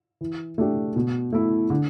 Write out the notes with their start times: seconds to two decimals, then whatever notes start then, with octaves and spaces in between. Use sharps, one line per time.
0.21 E3
0.58 A3 D4 G4
0.96 B2
1.32 A3 E4
1.70 D3